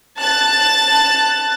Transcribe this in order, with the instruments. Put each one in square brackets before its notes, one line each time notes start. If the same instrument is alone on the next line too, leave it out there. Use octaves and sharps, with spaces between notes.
[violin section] A5 F#6 A6